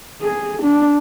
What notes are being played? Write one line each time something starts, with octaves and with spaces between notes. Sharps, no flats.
G#4
D4